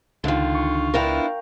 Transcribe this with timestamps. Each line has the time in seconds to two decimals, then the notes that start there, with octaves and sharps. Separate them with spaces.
0.24 C#2 D3 D#3 F4
0.54 C#6
0.94 B3 D4 E4 A#4 F5 G5